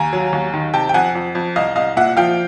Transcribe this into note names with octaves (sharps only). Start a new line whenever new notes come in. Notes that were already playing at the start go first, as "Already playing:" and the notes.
Already playing: D#2 G#5 A#5
F#3
D#2
D#3
C3 G5 A5
G5
F2 F#5 G#5
F2
F2
C2 D#5 F5
C2 D#5 F5
A#2 E5 F#5
F3 F5 G5